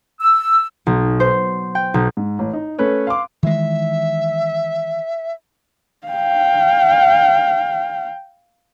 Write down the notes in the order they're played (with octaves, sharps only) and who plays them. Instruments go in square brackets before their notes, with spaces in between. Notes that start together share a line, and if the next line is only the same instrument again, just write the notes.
[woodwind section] E6
[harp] B1
C5
G5
B1
[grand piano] G#2
A1
D#4
A3 C#4 B4 C#5
F5 C6 D6
[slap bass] D#3 E3 G#3 [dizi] E5
[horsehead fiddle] F5 G5